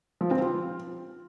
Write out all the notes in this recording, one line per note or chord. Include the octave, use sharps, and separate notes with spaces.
F3
C4
F4